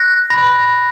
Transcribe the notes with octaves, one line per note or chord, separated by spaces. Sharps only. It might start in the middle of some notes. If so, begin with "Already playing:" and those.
Already playing: F#6 A#6
B5 A#6